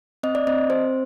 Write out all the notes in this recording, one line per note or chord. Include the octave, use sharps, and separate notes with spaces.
C4 D#5
D5
C4 D#5
C4 C5